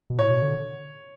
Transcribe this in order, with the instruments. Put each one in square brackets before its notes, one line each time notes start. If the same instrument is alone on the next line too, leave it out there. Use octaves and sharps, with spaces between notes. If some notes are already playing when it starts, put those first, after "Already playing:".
[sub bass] B2
[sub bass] A2 [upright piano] C#5
[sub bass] B2
D3